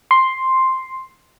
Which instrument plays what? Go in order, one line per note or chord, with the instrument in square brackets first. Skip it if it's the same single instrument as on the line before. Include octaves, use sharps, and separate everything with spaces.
[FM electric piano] C6